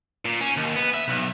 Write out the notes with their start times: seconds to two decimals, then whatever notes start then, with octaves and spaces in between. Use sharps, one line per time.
0.25 A#2
0.41 C#4
0.57 D#2
0.75 B3
0.94 E5
1.08 B1